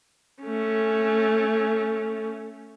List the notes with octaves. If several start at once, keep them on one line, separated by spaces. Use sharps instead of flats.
A3 C#4